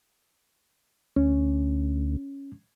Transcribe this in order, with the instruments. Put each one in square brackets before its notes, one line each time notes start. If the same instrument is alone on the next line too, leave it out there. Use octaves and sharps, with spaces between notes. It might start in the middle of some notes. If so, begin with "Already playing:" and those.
[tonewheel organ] D2 [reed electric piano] C#4